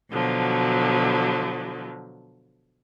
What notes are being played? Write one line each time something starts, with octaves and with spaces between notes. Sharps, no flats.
B2 D3 F3 F#3